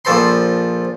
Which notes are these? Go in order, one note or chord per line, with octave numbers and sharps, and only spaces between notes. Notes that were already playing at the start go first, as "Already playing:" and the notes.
A#1 F3 A4 C5 B5 C6